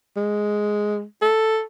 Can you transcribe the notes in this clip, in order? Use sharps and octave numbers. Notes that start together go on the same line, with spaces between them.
G#3
A4